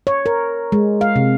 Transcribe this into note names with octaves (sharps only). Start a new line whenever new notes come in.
C#5
A#4
G#3
F5
C3